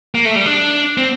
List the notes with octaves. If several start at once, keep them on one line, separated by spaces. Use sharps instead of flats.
A#3
A3
G3
D4
C4